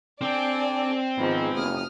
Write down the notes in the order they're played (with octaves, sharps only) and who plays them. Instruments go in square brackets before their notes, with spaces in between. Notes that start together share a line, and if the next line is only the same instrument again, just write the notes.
[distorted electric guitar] C4 G5 [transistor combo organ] D4 A4 [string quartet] D5 G#5
[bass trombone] G#2 [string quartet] D#3 F3 [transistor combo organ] G#3 B3
[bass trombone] F#1 [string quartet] D#6 F6